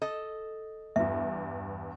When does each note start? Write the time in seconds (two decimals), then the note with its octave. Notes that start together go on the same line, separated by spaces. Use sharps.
0.02 A4 D#5
0.96 E2 G2 E5